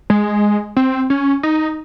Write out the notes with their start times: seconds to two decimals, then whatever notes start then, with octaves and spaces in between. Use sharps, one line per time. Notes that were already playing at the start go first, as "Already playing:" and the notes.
0.10 G#3
0.77 C4
1.10 C#4
1.43 D#4